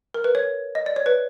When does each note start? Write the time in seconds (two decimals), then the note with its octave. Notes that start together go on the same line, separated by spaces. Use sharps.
0.14 A#4
0.24 B4
0.35 C#5
0.75 D#5
0.86 D5
0.96 C#5
1.06 B4